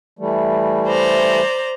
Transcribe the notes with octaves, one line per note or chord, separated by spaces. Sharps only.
E3 G3 A3
C5 D5 A#5